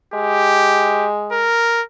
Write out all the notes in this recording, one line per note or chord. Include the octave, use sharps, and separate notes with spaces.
G#3 G4
A#4